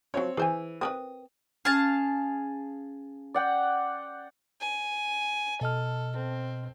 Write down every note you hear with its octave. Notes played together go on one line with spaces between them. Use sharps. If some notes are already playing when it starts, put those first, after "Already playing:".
F3 F#3 C4 C#5
E3 G#4 C5 G#5
C4 A#4 B4 D#6
C#4 G#4 F5 A5 F6
D5 F#5 G5
G#5
B2 A4 D#5 F6
C4